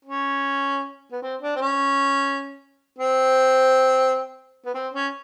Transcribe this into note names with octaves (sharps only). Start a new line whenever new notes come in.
C#4
B3
C4
D4
C4
C#4
C4
B3
C4
C#4